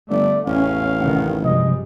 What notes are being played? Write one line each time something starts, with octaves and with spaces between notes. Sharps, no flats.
G1 A3 D5
A1 E2 C#4 F5
F1 D#3 C#4 F#5
G2 C3 F3 G3 G#3 D#5